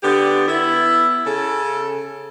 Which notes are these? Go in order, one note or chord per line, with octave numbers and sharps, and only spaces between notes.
D3 B3 G4
B3 E4
C#3 A4